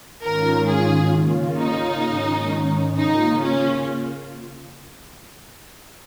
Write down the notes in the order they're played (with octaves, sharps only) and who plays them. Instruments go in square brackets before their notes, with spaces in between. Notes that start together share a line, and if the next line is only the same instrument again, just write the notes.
[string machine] G#2 D#3 C#4 F4 [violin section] A#4
[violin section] G#4
[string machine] C#3 A#3 C#4 F4
[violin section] D#4
[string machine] G#2 D#3 C#4
[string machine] C#3 A#3 F4 [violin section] D#4
[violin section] C#4